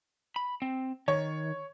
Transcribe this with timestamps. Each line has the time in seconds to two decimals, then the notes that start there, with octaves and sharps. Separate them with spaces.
0.36 B5
0.62 C4
1.08 D#3 C#5